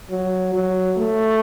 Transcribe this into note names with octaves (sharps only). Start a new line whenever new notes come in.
F#3
F#3
A3